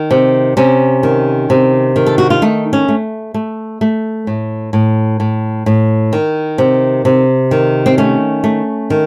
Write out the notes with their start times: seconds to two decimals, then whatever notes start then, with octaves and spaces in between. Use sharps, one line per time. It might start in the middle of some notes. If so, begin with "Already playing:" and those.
Already playing: D#3
0.11 C3
0.57 C3 C#4
1.03 D#3
1.50 C3
1.96 D#3
2.06 A4
2.18 F#4
2.30 F4
2.42 A3 D#4
2.73 C#4
2.88 A3
3.34 A3
3.81 A3
4.27 A2
4.73 A2
5.20 A2
5.66 A2
6.13 D#3
6.58 C3
7.05 C3
7.51 D#3
7.86 C4
7.98 A3 C#4
8.44 A3
8.90 D#3